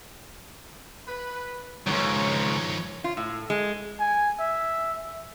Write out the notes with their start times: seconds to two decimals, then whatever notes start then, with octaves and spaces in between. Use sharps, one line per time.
1.07 B4
1.87 C#2 F#2 D#3 F3 C#5
3.04 F4
3.17 A2
3.50 G#3
4.00 G#5
4.39 E5